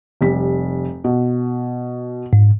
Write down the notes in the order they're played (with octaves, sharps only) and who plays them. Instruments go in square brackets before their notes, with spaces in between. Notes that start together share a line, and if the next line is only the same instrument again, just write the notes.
[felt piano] F1 G3 B6
B2
[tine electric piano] G#2